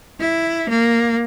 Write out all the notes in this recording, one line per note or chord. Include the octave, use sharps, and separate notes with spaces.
E4
A#3